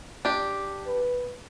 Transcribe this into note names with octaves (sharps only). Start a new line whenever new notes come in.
D4 G4
B4